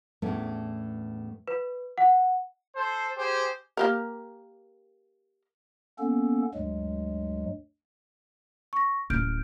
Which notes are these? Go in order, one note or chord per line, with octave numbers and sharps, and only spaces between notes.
E2 A2 A3 B3 C#4 D4
B4
F#5
A4 C5
G4 G#4 C5
A#3 G4 A#4
A#3 B3 C#4 A4
D2 G2 F#3 G#3
C#6 A#6
D1 C#4 F6 G6 D7